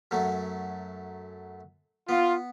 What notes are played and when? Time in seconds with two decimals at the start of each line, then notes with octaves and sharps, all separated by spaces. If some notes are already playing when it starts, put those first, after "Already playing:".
0.11 F#2 F#3 A3
2.09 B3 F4